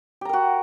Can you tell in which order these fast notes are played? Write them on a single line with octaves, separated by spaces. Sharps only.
G4 A#5 A#4 F#4